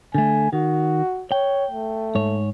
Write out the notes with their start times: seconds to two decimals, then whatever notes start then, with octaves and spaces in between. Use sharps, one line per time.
0.15 D3 A3 G#5
0.53 D#3 F#4
1.32 C#5 G5
1.71 A3
2.15 G#2 C#5